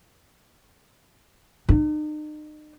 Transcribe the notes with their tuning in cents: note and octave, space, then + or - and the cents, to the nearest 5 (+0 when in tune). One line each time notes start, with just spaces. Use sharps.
D#4 -40